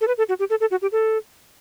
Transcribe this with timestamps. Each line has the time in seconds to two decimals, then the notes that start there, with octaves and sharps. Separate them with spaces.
0.01 A4
0.07 B4
0.18 A4
0.29 F#4
0.39 G4
0.50 A4
0.61 A4
0.71 F#4
0.82 G4
0.92 A4